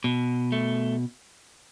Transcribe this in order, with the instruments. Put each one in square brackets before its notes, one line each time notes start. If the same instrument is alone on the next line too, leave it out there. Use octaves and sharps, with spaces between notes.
[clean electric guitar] B2
A3